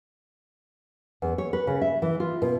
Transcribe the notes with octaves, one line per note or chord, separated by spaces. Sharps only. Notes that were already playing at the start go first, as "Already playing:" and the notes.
E2
C#5
B4
C#3
E5
E3
F4
B2